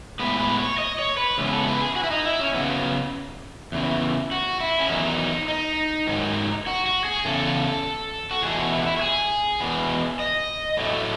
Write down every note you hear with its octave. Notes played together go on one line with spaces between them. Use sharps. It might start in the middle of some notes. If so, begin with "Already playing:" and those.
A2 G#3 B3 B4
B4
C#5
D#5
C#5
B4
C#3 E3 G#3 B3
A4
B4
G#4
F#4
E4
D#4
E4
C#4
C#3 F#3 B3
E2 C#3 E3
F#4
E4
C#4
E2 D#3 F#3 D#4
D#4
G#2 D#3 F#3
F#4
F#4
G#4
E2 C#3 A4
F#4
E2 B2 A3 G#4
F#4
E4
F#4
E4
F#4
G#4
E2 B2 G#3 B3
D#5
A2 F#3 A3